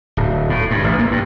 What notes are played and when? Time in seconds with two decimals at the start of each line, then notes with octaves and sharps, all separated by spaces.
0.17 D1
0.50 A2
0.71 G2
0.84 A1
0.99 A#3
1.11 G2